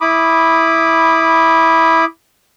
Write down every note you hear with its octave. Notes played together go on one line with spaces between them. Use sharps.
E4 B5 D6 D#6